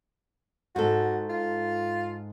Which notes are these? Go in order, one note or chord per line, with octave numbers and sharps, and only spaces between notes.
G#2 F#4 A4
F4